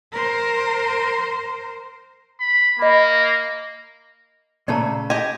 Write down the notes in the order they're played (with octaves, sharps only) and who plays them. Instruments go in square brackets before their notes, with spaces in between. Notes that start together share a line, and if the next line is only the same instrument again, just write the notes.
[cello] A#4 C5
[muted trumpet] B5
[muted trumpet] A#3 [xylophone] D#5 B5
[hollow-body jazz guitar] A#2 C#3 A3 [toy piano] D5 A5 A#5
[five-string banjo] G4 D#5 G#5